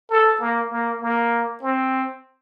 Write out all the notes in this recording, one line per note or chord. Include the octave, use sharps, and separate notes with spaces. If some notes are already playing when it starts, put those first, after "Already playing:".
A4
A#3
A#3
A#3
C4